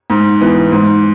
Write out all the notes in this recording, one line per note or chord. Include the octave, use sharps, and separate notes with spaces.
G#2
E3 B3
G#2